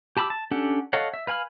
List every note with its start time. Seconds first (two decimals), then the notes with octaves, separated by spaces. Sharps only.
0.17 G4 A5 B5 D6 E6
0.30 A5
0.51 C#4 D4 G4 A4 F#5
0.93 A4 C#5 D#5 F5 F#5
1.14 E5
1.27 B4 F5 G#5 B5 F6